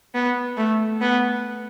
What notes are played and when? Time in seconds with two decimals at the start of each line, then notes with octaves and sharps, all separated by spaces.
0.14 B3
0.57 A3
1.01 B3